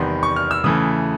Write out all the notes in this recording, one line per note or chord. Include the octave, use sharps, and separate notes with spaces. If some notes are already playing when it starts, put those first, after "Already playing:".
Already playing: E2 C3 D#3 G3 B3 C6
C#6
F6
E6
C#3 E3 A3 D#6